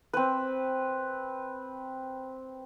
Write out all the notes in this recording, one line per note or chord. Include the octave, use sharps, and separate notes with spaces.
C4 B4